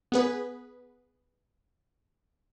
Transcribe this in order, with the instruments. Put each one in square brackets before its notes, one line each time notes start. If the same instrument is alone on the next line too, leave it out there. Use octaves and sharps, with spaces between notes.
[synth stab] B3 G#4 B4